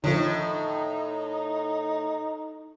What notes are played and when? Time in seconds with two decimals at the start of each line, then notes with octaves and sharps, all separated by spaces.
0.04 A2 D3 D#3 F3 D#4